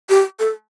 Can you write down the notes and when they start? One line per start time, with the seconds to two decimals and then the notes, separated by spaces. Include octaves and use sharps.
0.09 G4
0.39 A4